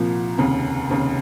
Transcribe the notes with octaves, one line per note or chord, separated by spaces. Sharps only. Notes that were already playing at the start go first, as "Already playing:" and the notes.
Already playing: C2 A#2 F3
F1 D#2 C#3
F1 D#2 C#3